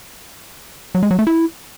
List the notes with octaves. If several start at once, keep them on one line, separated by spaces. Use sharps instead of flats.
F#3
G#3
F#3
A3
E4